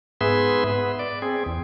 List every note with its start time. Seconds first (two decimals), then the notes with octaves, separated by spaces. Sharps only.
0.21 G#2 B3 G#4 B4 E5 C6
0.67 B4
0.99 D5
1.22 C4 G#4
1.46 E2